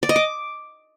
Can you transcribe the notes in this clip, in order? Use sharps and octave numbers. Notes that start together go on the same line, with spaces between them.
D5
D#5
D6